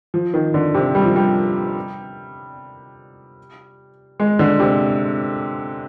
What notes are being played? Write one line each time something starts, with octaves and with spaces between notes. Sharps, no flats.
F3
D#3
D3
C3
G3
F3
G3
G#3
D3
C3